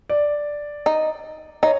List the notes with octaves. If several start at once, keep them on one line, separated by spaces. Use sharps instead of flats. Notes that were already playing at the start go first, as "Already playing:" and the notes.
D5
D#4
D#4 C#5